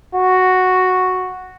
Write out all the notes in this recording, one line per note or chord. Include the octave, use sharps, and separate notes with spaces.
F#4